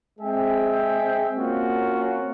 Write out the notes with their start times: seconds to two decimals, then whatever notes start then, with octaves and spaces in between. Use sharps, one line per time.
0.20 G#3 C4 G#4 E5 G5
1.36 A#3 C4 C#4 F4 F#4